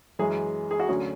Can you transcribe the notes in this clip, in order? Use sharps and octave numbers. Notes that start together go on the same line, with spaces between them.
F#2 E3 G#3 G#4
G#4
F#4
D2 D3 F#3 C#4 G#4